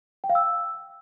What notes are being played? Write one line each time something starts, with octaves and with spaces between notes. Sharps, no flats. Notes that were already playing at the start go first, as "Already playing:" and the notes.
G5
F5
E6